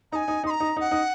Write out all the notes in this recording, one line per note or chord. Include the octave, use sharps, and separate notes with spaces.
D#4 G#5 A#5
D#4
D#4 C6
A#5
D#4
D#4
F#5
D#4